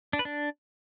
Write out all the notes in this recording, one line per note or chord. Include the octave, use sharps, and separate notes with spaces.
D4
B4
D4